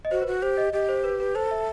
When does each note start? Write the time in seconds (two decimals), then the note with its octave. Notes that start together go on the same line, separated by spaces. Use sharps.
0.05 D#5
0.11 F#4 C5
0.22 B4
0.27 F#4
0.42 G4 C5
0.57 D#5
0.73 G4 D#5
0.89 C5
1.04 B4
1.20 B4
1.35 A4 C5
1.51 E5